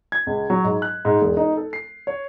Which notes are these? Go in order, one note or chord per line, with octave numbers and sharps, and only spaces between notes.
G#6
C#2
F#3
G#2
F#6
G#2
E1
D#4
A4
C7
C#5